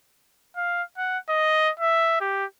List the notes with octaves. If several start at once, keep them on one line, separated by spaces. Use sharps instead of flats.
F5
F#5
D#5
E5
G4